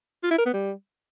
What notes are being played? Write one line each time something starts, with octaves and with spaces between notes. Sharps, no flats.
F4
E4
A#4
B3
G3